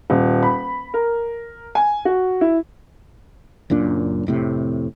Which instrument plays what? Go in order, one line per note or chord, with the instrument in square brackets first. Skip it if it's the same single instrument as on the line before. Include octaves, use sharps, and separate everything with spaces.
[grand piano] D#1
B5
A#4
G#5
F#4
E4
[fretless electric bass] F#1 F#2 A#2 D4
F1 A2 C3